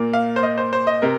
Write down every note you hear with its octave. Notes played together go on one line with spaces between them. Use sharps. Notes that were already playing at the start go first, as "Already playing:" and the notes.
Already playing: A#2 A#3
F5
C5
D#5
C5
C5
D#5
C3 A#4